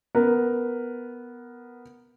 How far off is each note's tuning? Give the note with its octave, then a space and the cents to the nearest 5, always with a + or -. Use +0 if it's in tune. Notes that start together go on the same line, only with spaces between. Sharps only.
B3 +0 A#4 +0